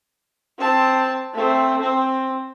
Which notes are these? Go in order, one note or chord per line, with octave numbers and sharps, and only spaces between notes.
C4 A5
A3 C4
C4